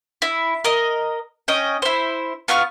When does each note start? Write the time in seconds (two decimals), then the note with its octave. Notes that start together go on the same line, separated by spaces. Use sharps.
0.22 E4
0.64 A#4 D#5
1.48 C#4 D#5 G5
1.82 E4 C5
2.48 B3 F4 C#6 F6